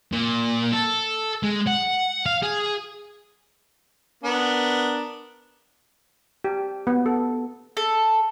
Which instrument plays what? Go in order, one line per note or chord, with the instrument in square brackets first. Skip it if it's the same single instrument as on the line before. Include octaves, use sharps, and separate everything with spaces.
[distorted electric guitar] A#2
A4
G#3
F#5
F5
G#4
[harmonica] B3 D4 A#4
[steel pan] G4
B3
A4
[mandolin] A4